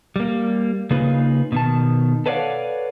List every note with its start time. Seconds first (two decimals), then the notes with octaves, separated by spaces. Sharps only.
0.16 G3 A#3
0.91 C#3 A#3 D#4 F4 G#4 B4
1.52 B2 D#3 A5
2.26 A4 B4 C#5 D5 F5 F#5